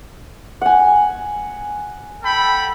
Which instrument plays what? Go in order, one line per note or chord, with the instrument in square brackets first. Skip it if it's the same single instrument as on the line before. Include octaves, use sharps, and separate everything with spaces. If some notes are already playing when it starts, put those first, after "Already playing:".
[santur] F#5 G#5
[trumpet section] A4 G5 B5